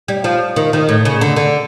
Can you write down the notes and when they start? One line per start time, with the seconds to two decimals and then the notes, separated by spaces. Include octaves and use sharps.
0.08 G3
0.24 F3
0.56 D#3
0.73 D#3
0.89 A2
1.05 C#3
1.21 D3
1.36 D3